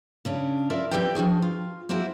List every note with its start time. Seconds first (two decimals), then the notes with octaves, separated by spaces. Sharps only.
0.25 C#3 C#4 D4
0.70 E4 F4 A#4 D5 E5
0.91 C4 E4 G4 B4 D5 G5
1.15 F3 D4 F#4 G#4
1.42 F4
1.89 A#3 C4 E4 F#4 G#4